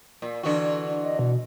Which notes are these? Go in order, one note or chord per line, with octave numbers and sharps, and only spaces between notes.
A#2
D3 E3 F#4
D#5
B2